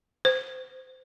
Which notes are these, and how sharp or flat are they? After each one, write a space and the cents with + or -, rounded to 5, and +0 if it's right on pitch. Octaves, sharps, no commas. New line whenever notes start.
C5 -20